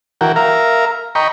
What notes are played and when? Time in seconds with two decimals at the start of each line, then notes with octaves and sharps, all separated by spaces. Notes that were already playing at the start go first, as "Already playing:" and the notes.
0.21 E3 F#4 A#4 G5
0.36 A#4 E5 F5 A#5
1.15 D#5 G5 A#5 B5 C#6